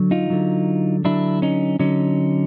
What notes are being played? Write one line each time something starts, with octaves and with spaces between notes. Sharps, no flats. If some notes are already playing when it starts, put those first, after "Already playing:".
Already playing: D3 F#3
D#4 F4
D3 F#3
D3 F#3 D4 E4
C#4 D#4
D3 F#3 C#4 D#4